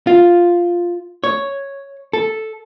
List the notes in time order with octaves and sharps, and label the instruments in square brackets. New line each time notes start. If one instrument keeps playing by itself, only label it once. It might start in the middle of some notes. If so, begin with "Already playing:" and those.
[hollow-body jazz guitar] F4
C#5
A4